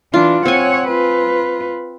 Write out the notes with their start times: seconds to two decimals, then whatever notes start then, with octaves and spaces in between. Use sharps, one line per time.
0.14 E3 D4 F4
0.45 C4 C#5 F#5 G#5
0.87 F4 B4